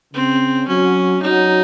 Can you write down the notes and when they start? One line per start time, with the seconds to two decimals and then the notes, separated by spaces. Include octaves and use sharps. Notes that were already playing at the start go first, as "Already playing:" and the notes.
0.14 C#3 C4
0.68 F#3 C#4
1.22 F#3 D#4